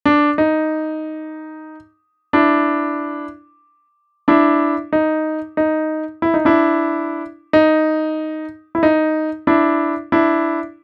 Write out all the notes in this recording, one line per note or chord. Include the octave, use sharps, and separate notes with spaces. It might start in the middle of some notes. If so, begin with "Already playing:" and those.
D4
D#4
D4 E4
D4 E4
D#4
D#4
E4
D#4
D4 E4
D#4
E4
D#4
D4 E4
D4 E4